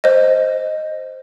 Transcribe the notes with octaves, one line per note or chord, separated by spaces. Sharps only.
C5 D#5